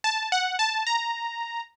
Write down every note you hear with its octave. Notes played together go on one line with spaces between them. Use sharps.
A5
F#5
A5
A#5